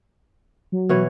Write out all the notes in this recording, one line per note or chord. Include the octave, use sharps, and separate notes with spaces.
F#3
B2 E3 C#5